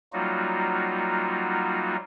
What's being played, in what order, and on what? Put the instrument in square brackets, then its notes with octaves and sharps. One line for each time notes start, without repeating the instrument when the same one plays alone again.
[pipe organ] F#3 G3 A#3 D#4 F4 F#4